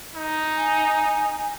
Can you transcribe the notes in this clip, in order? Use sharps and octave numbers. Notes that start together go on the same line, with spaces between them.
D#4
G#5